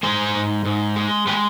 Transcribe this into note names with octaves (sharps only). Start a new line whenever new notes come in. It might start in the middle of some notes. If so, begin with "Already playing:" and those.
G#3 G#4 C5
G#2
G#2
G#3
G#3 G4 B4